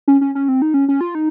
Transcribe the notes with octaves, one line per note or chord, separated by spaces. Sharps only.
C#4
C#4
C#4
C4
D#4
C#4
C#4
F4
D#4